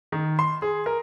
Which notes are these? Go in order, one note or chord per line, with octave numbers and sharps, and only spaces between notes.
D#3
C6
G#4
A#4